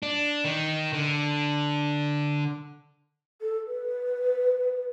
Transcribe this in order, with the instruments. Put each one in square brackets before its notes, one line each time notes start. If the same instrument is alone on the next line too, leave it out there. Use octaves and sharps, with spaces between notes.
[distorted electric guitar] D4
D#3
D3
[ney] A4
B4